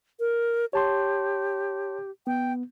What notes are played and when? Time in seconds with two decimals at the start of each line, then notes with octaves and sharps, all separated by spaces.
0.20 A#4
0.73 G4 C#5 A5 C6
2.27 B3 G5